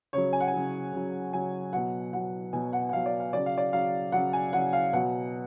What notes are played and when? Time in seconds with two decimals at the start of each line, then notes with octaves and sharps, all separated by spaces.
0.13 C#3 F#3 C#5
0.33 G#5
0.40 F#5
0.48 G#5
0.53 C#3 F#3
0.93 C#3 F#3
1.33 C#3 F#3 G#5
1.73 B2 F#3 F#5
2.13 B2 F#3 F#5
2.53 B2 F#3 G#5
2.73 F#5
2.89 F#5
2.93 B2 F#3 F5
3.06 D5
3.20 F5
3.33 C#3 F#3 D5
3.46 F5
3.58 D5
3.73 C#3 F#3 F5
4.12 C#3 F#3 F#5
4.33 G#5
4.53 C#3 F#3 F#5
4.73 F5
4.93 B2 F#3 F#5